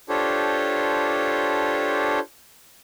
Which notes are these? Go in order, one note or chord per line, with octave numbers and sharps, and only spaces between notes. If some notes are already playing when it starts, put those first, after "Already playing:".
D4 F4 G4 A4 C5 C#5